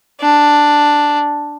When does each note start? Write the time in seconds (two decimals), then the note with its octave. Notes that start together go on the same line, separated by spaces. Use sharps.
0.21 D4